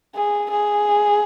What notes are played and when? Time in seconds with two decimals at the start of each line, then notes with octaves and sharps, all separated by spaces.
0.15 G#4
0.51 G#4